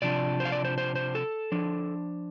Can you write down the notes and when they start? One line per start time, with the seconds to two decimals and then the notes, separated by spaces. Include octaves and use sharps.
0.02 C3 F3 D4 D5
0.40 C5
0.45 F5
0.52 D5
0.65 C5
0.78 C5
0.95 C5
1.15 A4
1.52 F3 D4